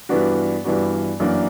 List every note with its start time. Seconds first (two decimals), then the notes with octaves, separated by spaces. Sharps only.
0.09 G2 E3 B3 D4 F#4
0.65 G2 E3 B3 D4 F#4
1.20 F#2 E3 A#3 D4